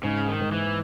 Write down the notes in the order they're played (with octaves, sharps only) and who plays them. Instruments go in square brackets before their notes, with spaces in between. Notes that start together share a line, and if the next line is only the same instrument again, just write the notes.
[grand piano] G#2 [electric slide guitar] C#3
[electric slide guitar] D#3
[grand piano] G#2
[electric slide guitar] E3